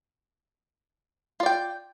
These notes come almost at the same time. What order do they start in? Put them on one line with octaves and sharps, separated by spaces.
F4 D5 G5